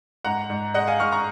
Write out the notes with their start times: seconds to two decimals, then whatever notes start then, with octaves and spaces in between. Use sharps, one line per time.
0.24 G#2 F#5 A#5
0.50 G#2
0.74 G#3 D#5 F#5
0.87 F5 G#5
1.00 G#2 C#6 F6
1.12 A#5 C#6